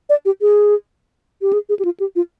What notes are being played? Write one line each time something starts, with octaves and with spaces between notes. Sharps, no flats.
D5
G4
G#4
G4
G#4
G#4
G4
F4
G4
F4